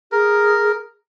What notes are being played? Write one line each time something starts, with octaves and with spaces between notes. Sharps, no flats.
G#4 A#4